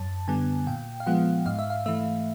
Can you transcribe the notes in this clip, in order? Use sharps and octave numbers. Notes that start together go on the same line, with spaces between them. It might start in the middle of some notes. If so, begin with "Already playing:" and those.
Already playing: F#2 A5
D3 G3 B3 G#5
A#2 G5
F5
F3 G#3 B3 F#5
G#2 F5
E5
F5
E3 A3 E5